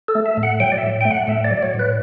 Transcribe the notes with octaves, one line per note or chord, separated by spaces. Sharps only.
A4
A3
E5
A2
F#5
F#3 G5
D5
E5
A2
A3 G5
F#5
A2 E5
D5
F#3
D5
C#5
A2
B4